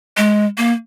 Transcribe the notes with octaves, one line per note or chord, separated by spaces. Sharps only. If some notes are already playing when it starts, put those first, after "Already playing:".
G#3
A#3